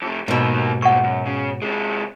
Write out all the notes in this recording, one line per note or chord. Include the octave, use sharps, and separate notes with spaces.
F2 C3
G#2 B2 D#3 A#3
G2 A#2 F#5 C#6
F#2
C#3
C3 G#3